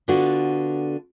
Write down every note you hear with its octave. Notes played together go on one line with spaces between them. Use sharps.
D3 B3 D4 F4 F#4